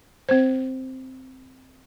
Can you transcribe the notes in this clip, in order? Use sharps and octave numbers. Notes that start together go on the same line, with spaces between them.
C4 C5